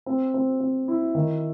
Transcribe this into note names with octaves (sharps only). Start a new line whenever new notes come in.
C4
C4
C4
E4
D#3